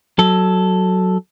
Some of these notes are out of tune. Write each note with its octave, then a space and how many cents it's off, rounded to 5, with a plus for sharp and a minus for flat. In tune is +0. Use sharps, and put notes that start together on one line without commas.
F#3 +5 A4 +0